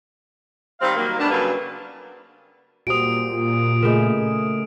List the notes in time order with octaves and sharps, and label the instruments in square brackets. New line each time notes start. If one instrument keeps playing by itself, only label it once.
[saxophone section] D#3 G3 C4 F5
D#3 F#3 G3 A#3
G3 A3 B3 D4
C#3 F#3 G3 A#3 A4 B4
[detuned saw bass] A#2 [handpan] F#4 G4 C5 [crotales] D#6 D7
[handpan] C#3 G#4 D#5 [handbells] A3 A#4